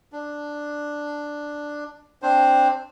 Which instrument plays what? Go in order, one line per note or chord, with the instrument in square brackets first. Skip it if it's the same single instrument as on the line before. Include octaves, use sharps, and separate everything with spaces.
[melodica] D4
C4 D4 C5